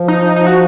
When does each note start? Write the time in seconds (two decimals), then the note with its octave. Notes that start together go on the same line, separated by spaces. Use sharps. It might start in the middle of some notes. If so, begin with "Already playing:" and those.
Already playing: F3
0.08 D#4
0.36 D#4
0.47 F#4